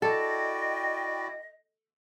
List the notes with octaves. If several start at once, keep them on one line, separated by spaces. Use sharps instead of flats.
E4 F#4 A4 D5 D#5 G5